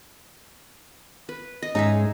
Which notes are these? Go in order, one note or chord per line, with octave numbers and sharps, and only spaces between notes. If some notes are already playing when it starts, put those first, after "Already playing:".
B4
D#5
G#2 G#3 C#4 D#4 G#4 E5